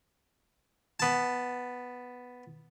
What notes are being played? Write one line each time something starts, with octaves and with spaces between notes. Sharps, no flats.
B3 A5